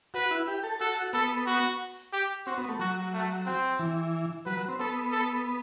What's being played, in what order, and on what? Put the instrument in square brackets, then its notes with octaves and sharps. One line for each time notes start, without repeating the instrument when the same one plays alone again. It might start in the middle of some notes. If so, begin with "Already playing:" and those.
[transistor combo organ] F#4 [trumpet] B4
[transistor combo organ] E4
G4
A4
[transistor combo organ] F#4 [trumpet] A4
[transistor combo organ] B3 [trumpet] A4
[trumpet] F#4
G4
[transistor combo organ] C4 [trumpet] F#4
[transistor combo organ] B3
A3
[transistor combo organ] F#3 [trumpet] F#4
[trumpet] A3
C4
[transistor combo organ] E3
[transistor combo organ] F#3 [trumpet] B4
[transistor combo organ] F#3
C4
[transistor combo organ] B3 [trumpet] A4
[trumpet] A4